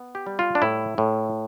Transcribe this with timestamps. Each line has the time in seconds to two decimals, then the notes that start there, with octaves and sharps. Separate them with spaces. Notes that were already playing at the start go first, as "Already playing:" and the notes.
Already playing: B3
0.15 G4
0.27 G3
0.39 F4
0.55 D4
0.62 A2 E4
0.98 A2